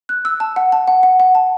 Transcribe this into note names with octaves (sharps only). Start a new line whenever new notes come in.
F#6
E6
A5
F#5
A5
F#5
F#5
F#5
A5